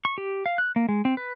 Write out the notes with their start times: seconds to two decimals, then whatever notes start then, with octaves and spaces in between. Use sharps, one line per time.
0.05 C#6
0.18 G4
0.46 F5
0.58 F#6
0.76 A#3
0.89 G#3
1.05 C4
1.17 B4